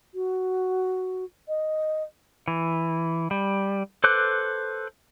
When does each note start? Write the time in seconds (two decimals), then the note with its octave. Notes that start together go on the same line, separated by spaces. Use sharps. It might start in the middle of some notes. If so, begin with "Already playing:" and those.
0.14 F#4
1.48 D#5
2.48 E3
3.31 G3
4.04 A4 B4 C5 D6 F#6